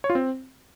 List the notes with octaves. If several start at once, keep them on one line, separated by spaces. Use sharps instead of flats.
C#5
F4
C4